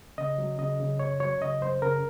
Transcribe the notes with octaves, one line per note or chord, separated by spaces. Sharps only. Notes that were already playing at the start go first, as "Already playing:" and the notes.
C#3 D#5
F#3
C#3 D#5
C#3
F#2 C#5
F#3 C#5
C#3 D#5
F#2 C5
C#3 A#4